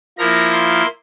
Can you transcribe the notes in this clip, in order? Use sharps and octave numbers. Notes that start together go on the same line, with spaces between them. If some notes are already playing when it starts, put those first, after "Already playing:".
F3 A#3 E4 A#5
C6